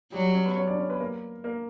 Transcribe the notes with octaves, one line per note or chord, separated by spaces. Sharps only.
F#3 G3 G4
C#4 C#5
B3 B4
C#4 C#5
D4 D5
C#4 C#5
B3 B4
A#3 A#4
A#3 A#4